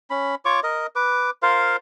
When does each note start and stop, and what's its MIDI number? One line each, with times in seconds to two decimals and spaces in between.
0.10 0.35 61
0.10 0.35 83
0.45 0.60 65
0.45 0.60 73
0.45 0.60 85
0.45 0.60 86
0.63 0.87 70
0.63 0.87 75
0.96 1.30 71
0.96 1.30 86
1.43 1.76 65
1.43 1.76 70
1.43 1.76 72
1.43 1.76 77